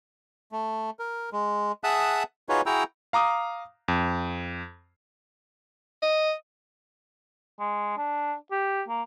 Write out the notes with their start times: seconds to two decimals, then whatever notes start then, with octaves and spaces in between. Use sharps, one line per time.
0.52 A3
0.99 A#4
1.32 G#3
1.84 G#4 E5 F#5 A5 D#6 F#6
2.49 D#4 F4 F#4 G#4 B4 C#5
2.66 E4 F#4 G#4 G5 A#5 E6
3.13 F5 A#5 D6 D#6
3.88 F2
6.03 D#5
7.59 G#3
7.97 D4
8.51 G4
8.88 A#3